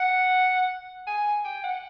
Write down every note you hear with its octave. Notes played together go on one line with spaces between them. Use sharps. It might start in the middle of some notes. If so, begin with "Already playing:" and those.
Already playing: F#5
G#5
G5
F#5